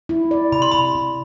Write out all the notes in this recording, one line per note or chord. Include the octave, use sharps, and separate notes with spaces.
E4
D5
C3 B5
C6
C3 B5
C3